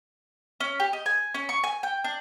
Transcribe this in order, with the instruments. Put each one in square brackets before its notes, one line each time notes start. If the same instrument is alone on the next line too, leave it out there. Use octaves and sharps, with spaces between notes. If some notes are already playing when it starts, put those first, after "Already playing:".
[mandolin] C#4
G4
D#5
G#5
C#4
C#6
G#5
G5
D4